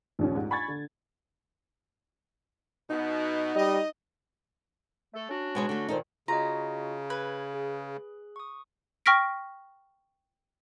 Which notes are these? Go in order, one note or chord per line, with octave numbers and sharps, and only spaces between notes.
A#1 D#2 C#4
G#2
G#5 B5 C#6 G#6 A6
D3
B2 B3 D#4
G3 D#5
A3 A4
C#4 D4 F#4
B2 G#3 C#5
D3 A3
A#2 D#3 D#4 A4 C5
C#3 F4 F#4 D#5 A#5
B4 G#6
G#4
C#6 D#6
G5 C#6 F6 A#6 B6 D7